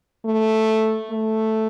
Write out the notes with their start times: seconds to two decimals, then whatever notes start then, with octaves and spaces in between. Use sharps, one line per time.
0.25 A3
1.10 A3